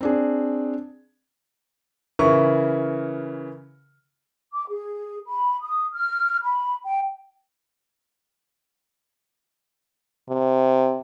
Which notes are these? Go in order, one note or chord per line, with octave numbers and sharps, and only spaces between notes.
C4 D4 G#4
C#3 E3 E4 A#4 C#6
D6
G#4
B5
D#6
F6
B5
G5
C3